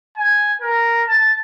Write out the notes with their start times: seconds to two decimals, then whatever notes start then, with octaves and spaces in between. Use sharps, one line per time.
0.17 G#5
0.61 A#4
1.08 A5